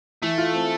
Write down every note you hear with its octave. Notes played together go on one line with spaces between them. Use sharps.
E3 A3
F4
C4